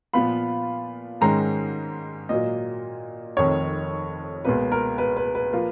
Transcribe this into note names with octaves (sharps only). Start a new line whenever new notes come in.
A#2 F3 B3 F4 B5
G#2 D#3 G#3 C#4 A#5
A#2 F#3 A#3 D#5
F1 F2 D#3 C#5
C#2 B2 A#3 B4
A#4
B4
B4
B4
F3 A#3 F4